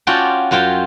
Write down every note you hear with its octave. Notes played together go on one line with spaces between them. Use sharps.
C#4 F4 F#4 D5 G5 A5
F#2 F#3 F4 G5